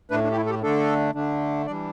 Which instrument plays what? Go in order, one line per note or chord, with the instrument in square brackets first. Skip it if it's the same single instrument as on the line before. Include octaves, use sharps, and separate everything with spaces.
[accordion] A2 A3 D4 B4
D4
G4
E4
A4
G4
D3 A3 D4 A4
D3 A3 D4
E3 G3 D4 D5